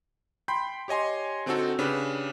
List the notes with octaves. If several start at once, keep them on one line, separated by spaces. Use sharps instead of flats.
G5 B5 C6 G6
G4 C#5 D#5 G#5 C6
D3 C4 D#4 F#4 A4
C#3 D4 G4 B4